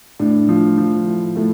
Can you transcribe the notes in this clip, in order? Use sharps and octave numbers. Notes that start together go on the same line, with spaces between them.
A2 D4
F3
F3
A2
A2 A3